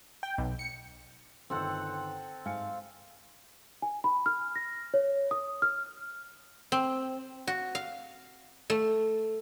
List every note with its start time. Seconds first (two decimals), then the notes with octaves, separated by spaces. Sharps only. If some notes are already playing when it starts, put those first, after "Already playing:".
0.23 G5
0.38 B1
0.59 C#7
1.50 G1 D#3 C4 A4 F#5
2.45 G#2 F5 G#5 C#7
3.82 G#5
4.04 B5
4.26 F6
4.56 A#6
4.94 C#5
5.31 D#6
5.62 F6
6.72 C4
7.47 F#4
7.75 F5
8.70 A3